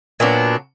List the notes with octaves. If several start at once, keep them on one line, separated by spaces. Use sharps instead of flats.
A#2 F#3 B3 D4